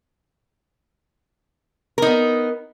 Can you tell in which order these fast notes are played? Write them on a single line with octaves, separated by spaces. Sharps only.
A#4 D#4 B3